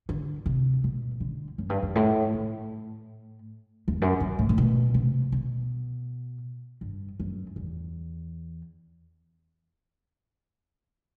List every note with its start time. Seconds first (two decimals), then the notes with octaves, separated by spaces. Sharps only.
0.09 D3
0.46 C3
0.84 B2
1.20 D3
1.58 F#2
1.69 G2
1.82 F#2
1.96 A2
2.33 A2
3.88 E2
4.02 F#2
4.20 F#2
4.39 A2
4.49 A2
4.58 B2
4.94 C3
5.32 B2
6.81 G2
7.20 F#2
7.56 E2